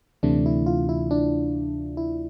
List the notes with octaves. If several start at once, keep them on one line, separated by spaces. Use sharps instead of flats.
D2 C3 E3 A3 D4
E4
F4
E4
D4
E4